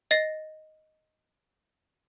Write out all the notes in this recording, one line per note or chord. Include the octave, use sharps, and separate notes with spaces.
D#5 A6 A#6 C7